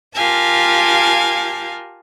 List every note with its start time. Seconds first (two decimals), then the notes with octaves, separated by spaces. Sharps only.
0.15 F4 G4 A#4 F5 G#5 A5